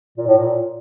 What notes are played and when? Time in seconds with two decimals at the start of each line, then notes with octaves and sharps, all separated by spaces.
0.17 A#2
0.27 A2
0.37 A#2